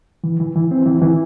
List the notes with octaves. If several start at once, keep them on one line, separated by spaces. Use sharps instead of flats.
E3
E3
E3
C4
E3
E3